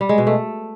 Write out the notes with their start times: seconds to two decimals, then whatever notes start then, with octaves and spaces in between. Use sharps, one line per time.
0.01 G3
0.09 G#3
0.18 B2
0.27 A3